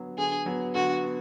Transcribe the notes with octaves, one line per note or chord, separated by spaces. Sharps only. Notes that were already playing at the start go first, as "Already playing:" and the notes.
Already playing: D3 F#3 B3
D3 G#4
F#3 B3
D3 F#4
B3